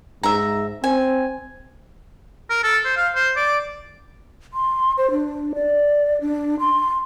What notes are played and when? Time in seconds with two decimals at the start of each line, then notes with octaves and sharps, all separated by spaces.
0.23 G#2 E5 A#5
0.84 C4 G#5
2.50 A#4
2.64 A4
2.85 C5
2.97 F5
3.15 C5
3.36 D5
4.54 C6
4.98 C5
5.11 D4
5.55 D5
6.21 D4
6.60 C6